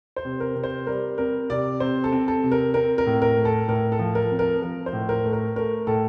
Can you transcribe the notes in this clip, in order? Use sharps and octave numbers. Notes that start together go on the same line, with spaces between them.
C5
C3
A#4
C3
C5
G3 A#4
C4 A#4
C3 D5
C3 C5
A4
C4
A4
C3
A#4
C4 A#4
A#4
A2
A#4
A3
A4
A2 A#4
A4
F3
A#4
C4
A#4
F3 A#4
C5
A2
A#4
A3
A#4
A3 A#4
A2 A4